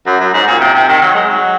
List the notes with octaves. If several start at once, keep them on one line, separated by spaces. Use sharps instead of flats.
F#2
F#2
G#2
A#2
C3
C3
D#3
F#3
G#3
F#3